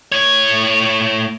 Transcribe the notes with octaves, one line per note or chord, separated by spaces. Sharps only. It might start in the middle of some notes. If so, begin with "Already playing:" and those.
A2 C#5